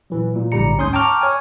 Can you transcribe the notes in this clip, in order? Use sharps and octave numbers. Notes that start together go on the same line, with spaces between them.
A#2 E3 F#3
A#2
A#1 G#2 D3 G3 A#5 C#7
D2 G#2 C#4 C6 D#6 G6
G5 A5 A#5 C#6 D6 F6
C#5 G#5